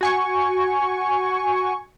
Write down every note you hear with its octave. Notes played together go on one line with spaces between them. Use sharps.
F#4 G#5 C#6